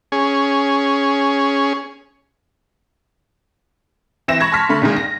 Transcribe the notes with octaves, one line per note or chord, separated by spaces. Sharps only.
C#4 G#4
E3 C4 E5 A#6 E7
B5 C#6 G#6 A#6
A5 C6 C#6 F6 B6
D3 A3 B5
A#2 D#3 G#3
A#6